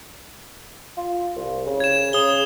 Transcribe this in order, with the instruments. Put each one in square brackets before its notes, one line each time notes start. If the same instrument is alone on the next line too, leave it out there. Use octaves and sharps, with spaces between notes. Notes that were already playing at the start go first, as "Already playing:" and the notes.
[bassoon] F4
C2
C#3
[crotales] G#6 E7
[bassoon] C#3 [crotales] D#6 G7